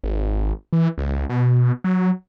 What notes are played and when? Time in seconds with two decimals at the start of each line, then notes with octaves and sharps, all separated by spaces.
0.04 G#1
0.73 E3
0.98 C#2
1.30 B2
1.84 F#3